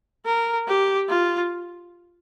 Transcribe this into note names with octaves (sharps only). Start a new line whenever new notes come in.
A#4
G4
F4